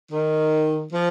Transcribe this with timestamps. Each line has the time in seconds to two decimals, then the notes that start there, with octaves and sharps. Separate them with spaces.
0.11 D#3
0.93 F3